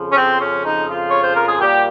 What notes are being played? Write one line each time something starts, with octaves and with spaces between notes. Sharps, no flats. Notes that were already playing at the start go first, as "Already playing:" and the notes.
Already playing: F2 C#3 F3
C#4
C4
C#4
D#4
F4
C#5
C5
A#4
G#4
A#2 G3 A#3 G4